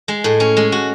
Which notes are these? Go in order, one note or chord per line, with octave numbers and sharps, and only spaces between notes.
G#3
A2
C#4
G#3
F#4